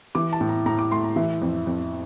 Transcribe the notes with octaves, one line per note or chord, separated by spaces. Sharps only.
E3 D6
A5
A2
A#5
A2 A#5
D6
A3 C6
A#5
E3 E5
F2
F2